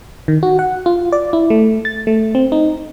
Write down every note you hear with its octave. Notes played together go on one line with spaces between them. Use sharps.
D#3
F#4
F#5
F4
D5
E4
A3
A6
A3
C4
D#4